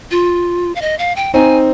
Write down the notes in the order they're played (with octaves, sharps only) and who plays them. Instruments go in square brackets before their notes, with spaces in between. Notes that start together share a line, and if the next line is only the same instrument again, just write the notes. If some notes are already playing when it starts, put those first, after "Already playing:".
[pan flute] F4
F5
D#5
F5
G5
[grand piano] C4 D#4 [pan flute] G#5